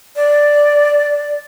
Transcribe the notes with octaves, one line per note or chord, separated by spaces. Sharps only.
D5